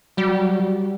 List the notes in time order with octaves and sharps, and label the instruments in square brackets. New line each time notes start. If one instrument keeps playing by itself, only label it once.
[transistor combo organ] F#3 [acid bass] G3